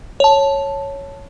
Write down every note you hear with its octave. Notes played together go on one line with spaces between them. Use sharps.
C#5 A5